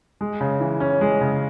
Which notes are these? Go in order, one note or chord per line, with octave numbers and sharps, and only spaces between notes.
G#3
C#3
E3
C#4
G#3
C#3